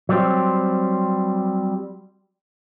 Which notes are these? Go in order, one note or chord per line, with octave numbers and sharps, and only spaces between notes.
F#3 G3 C4